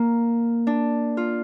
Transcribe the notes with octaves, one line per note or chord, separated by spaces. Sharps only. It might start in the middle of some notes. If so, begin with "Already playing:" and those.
Already playing: A#3
D4
F4